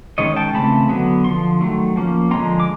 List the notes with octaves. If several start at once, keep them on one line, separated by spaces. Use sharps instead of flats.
D#3 G#3 C#4 C#5 D#5
G5 A5
C#3 E3 A3 C4 A5 B5
D3 F#3 B3
D3 F3 C6
D#3 F#3 A3
F3 A#3 C#4
D3 F3 G#3 C4 A#5 C6
D6